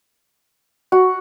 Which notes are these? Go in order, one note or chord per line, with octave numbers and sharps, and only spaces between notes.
F#4